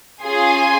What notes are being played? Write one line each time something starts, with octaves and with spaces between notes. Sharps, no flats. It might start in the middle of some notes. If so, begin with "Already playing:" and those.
C#4 F4 G#4 G#5 C6